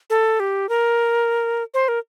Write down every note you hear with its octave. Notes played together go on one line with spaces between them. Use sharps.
A4
G4
A#4
C5
A#4